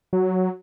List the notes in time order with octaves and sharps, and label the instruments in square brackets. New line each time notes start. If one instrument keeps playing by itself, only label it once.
[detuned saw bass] F#3